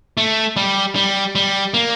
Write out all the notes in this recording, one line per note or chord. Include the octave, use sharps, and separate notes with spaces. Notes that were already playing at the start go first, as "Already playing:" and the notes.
A3
G3
G3
G3
A#3